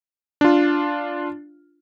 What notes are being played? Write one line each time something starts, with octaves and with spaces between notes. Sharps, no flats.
D4 F4